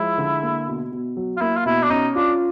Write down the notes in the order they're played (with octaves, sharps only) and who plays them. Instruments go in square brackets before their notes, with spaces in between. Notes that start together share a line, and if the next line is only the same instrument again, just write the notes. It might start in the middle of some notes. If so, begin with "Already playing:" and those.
Already playing: [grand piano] F3 G#3 [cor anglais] E4
[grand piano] D3
A#3
B2
B2
F#3
[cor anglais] F4
[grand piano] A#3 [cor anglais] E4
[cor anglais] F4
[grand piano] B2 [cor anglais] E4
[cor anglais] D4
[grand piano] C#4 [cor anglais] D#4
[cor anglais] D4 [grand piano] F4